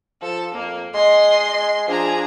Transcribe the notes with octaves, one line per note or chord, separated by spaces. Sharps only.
F3 A4
F2 A#3
G#3 D#5 C6
F3 D4 G#4 A#5